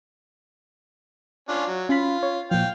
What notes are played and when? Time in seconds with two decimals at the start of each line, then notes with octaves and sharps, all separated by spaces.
1.49 C#4 D4 F4
1.67 F#3
1.89 C#4 F4 B5
2.23 C#5
2.51 A#2 F3 F5 G5